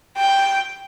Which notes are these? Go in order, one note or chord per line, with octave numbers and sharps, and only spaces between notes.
G5